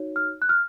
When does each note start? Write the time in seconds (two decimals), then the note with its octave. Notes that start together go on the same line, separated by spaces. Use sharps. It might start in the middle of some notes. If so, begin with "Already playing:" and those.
Already playing: D#4 F#4 C#5
0.16 F6
0.42 F#6
0.49 F6